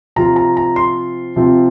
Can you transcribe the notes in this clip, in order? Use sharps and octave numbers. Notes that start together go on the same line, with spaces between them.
C3 F3 C4 F4 A#5
A#5
A#5
C6
C3 F3 C4 F4